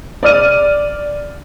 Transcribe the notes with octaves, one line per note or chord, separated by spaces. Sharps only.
D5 F6 D#7